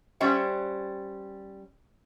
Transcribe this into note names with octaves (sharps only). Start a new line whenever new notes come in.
G3 C#4 C5 E5 F#5